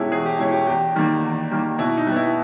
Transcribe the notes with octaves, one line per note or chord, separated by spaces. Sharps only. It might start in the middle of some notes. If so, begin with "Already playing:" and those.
Already playing: E2 B2 G#3 C#4 E4 G4
E2 G#4
G4
B2 G#3 C#4 E4
G4
E2 G4
D#3 G3 A#3
E2
D#3 G3 A#3
B2 E4
D#4
G3 B3
E4